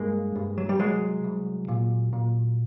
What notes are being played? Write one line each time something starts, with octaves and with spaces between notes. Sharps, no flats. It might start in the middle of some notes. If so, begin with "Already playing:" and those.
Already playing: G2 G#3 A#3
G2
F#3
G3
C2 F#3 G#3
C2
A#2
A#2